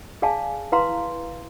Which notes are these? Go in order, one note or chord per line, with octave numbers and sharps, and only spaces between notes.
G#4 D5 F5 G#5 A5
E4 B4 F5 A#5 C6